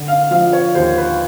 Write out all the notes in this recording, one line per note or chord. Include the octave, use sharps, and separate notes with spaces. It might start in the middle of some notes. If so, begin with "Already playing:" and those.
Already playing: D3
F5
F3 F5
C#5
D#2 C5
B4